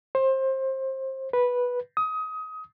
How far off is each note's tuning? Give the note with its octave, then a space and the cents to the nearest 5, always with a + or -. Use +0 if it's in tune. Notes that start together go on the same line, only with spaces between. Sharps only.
C5 +25
B4 -10
D#6 +25